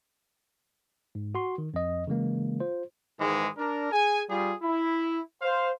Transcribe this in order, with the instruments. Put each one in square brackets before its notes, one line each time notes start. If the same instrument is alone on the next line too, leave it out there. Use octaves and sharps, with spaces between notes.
[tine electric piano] G#2
F#4 C6
D#3
F2 D#5
C#3 E3 G#3 A#3
F4 C5
[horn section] G#2 D#3 E3 G#3
D4 A#4
G#4 G#5
G3 F4 G#4
E4
C5 F5